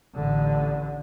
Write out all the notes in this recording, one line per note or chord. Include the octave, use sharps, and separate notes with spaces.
A1 D3